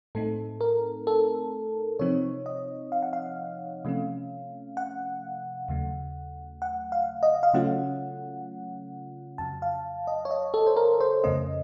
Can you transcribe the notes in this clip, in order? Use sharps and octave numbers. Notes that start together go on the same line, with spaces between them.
A2 A3 C4 D#4 A4
A#4
A4
C3 F3 C4 D#4 C#5
D#5
F5
F#5
F5
C3 F3 A3 C#4
F#5
D#2 C#3 F#3 A3
F#5
F5
D#5
F5
C#3 F#3 A3 C#4 F4 F#5
F2 C#3 F#3 A5
F5
D#5
C#5
D#5
A4
C5
A#4
C5
F2 C#3 A3 C#4 D#5